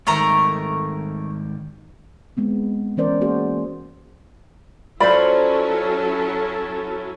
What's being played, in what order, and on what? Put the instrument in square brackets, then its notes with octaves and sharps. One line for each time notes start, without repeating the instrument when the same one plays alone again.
[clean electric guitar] G#2 D#3 G3 [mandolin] A3 A#4 A#5
[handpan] G#3 B3 C4
E3 B3 C#4 A#4 C5 D5
A#3 F#4 G#4 C5
[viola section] F#3 C#4 E4 [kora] F4 C5 [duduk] A4 [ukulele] D5 B5